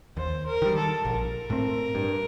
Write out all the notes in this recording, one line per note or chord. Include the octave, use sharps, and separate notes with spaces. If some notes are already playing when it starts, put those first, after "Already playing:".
D#2 C5
A#4
D#3 G3
A4
A#1 A#4
A2 A3 C4
G2